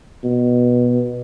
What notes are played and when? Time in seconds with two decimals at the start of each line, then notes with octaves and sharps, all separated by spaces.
0.24 B2